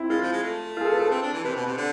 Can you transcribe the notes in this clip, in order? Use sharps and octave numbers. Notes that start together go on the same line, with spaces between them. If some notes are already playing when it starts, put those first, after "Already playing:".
Already playing: C4 E4
G#3 F4
F3
G#3
A3
F4
G#4
A4
B4
A4
C4
D4
E3
C3 B4
B2
C3
D3